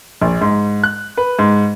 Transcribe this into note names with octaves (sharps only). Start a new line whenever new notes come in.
A#1
G#2
F#6
B4
G#2